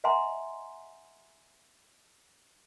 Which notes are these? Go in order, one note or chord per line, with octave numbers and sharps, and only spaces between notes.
D#5 E5 F#5 G#5 A#5 C6